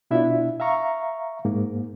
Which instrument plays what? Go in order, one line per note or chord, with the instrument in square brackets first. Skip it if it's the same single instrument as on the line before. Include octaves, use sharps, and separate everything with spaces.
[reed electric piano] B2 D4 E4 F4 E5
E5 F5 A#5 C#6
G#2 A#3